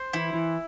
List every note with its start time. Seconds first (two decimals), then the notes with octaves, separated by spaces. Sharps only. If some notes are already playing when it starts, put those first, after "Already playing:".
Already playing: C5
0.13 E3 E4
0.34 E3